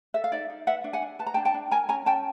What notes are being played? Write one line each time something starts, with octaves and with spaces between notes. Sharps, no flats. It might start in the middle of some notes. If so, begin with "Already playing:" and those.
A4 E5
F5
D#4 D5 E5
D#4
B4 E5 F#5
D4
F#5 G#5
D4
B4 A5
A#5
D4 G5 A5
G5 A5
D4
A#4 G#5 A#5
C#4 G#5 A#5
C#4 G5 A5